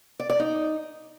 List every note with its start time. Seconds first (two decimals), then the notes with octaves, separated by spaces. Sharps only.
0.20 D5
0.30 D5
0.40 D#4